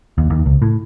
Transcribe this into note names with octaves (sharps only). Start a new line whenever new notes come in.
D#2
D#2
C#2
A2